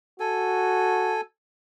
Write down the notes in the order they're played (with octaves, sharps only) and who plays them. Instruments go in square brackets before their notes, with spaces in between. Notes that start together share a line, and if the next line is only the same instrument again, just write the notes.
[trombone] F#4 [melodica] A4 G#5